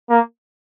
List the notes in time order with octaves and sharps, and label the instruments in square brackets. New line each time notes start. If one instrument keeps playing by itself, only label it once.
[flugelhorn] A#3